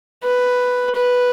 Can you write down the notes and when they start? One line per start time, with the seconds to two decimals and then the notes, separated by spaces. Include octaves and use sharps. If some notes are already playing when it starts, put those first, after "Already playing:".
0.24 B4
0.96 B4